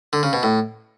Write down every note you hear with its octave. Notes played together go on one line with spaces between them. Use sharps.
D3
C#3
B2
A2